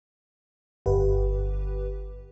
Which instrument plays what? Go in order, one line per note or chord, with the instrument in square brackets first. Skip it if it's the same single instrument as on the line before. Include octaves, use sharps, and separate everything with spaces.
[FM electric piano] G1 G4 B4